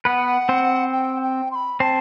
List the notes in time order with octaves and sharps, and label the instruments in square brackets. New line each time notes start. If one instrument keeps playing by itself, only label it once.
[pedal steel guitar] B3 B4 [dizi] F#5
[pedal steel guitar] C4 C5
[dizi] G5
G5
C6
B5
[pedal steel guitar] C4 C5 [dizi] A5